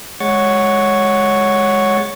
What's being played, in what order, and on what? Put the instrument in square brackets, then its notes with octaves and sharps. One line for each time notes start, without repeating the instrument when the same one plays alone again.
[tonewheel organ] G#3 C#5 F#5 C#6 A6